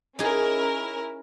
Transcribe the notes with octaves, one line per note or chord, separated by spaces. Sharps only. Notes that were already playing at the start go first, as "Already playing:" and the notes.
C#4 D#4 E4 G#4 A#4